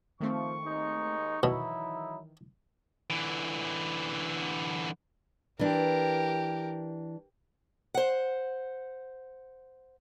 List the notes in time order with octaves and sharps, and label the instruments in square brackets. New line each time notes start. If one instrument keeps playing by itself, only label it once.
[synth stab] D#3 A3 C4 [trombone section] F3 [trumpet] C#6
[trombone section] D#2 G#3 D#4
[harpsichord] B2 [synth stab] D#3 E3 [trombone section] F#3 D#4 E4
[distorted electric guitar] D3 E3
[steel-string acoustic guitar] E3 D4 [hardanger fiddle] G4 A#4
[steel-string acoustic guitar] C5 F#5